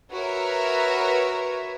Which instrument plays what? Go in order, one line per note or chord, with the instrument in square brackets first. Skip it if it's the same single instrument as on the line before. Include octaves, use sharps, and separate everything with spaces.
[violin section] F#4 A#4 B4 C#5 E5